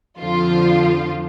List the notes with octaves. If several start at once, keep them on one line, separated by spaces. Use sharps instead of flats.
F2 D3 F3 F4